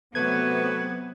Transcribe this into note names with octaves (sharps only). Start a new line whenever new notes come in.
C3 F#3 A3 B3 F#4 B4 G#6